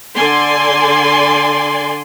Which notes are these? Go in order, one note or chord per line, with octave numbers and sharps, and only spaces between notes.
D3 D5 G#5 C6